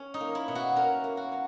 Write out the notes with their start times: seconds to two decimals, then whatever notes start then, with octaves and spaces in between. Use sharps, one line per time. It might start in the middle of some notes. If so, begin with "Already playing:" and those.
Already playing: C#4
0.14 D#4
0.21 A#3
0.35 E4
0.48 B2
0.55 F#4
0.76 C#4 A#4
1.04 A#3
1.17 F#4
1.32 F#3